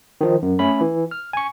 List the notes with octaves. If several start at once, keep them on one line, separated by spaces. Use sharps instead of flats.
D#3 F3 D#4
F#2
A3 C#4 B5
E3
F6
G#5 C#6